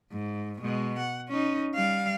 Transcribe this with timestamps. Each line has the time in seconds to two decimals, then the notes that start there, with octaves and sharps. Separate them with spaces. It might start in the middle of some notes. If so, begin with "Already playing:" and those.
0.12 G#2
0.62 B2 G#3
0.99 F#5
1.29 C#4 D#4
1.75 G3 F5